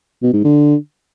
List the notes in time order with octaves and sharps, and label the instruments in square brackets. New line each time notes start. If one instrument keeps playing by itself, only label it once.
[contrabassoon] B2
G#2
D3